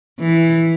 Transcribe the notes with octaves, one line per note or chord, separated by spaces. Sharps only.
E3